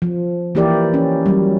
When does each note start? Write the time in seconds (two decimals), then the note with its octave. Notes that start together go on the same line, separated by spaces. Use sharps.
0.02 F3
0.55 E3 A#3 E4 G4 A#4 D5
0.94 C#4
1.26 F#3 G3